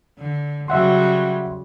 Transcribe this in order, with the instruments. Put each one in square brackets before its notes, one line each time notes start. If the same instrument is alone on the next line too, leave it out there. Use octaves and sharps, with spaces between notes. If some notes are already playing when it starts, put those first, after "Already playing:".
[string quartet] D3
[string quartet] C#3 F#3 G3 [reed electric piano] E5 F#5 C6